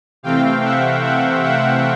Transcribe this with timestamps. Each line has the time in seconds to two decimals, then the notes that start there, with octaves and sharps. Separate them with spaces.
0.23 C3 E3 A3 C4 F5 G5
0.63 E5 F#5
1.03 E5 F#5
1.44 E5 F#5